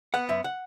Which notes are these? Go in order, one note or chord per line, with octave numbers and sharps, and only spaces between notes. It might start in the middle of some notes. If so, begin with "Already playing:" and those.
B3 F#5
F#2 E5
F#5